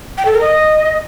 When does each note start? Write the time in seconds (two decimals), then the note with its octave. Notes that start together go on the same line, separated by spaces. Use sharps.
0.18 G5
0.25 A4
0.33 A#4
0.41 D#5